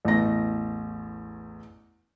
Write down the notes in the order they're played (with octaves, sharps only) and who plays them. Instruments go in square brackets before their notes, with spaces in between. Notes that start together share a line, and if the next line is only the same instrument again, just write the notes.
[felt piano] A1 E2 A#6